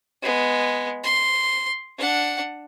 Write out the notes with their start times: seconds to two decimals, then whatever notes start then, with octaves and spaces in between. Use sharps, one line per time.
0.22 G#3 B3
1.04 C6
1.98 D4 F#5